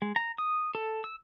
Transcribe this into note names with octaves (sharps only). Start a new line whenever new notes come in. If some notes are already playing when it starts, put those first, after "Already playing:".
G#3
A#5
D#6
A4
E6